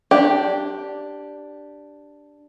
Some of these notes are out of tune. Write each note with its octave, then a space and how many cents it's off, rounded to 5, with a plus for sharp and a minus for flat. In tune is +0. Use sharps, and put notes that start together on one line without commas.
D4 +0 G4 +0